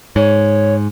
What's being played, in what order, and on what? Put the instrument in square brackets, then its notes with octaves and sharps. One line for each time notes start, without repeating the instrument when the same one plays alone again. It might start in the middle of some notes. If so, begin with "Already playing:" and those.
[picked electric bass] G#2 [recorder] C#5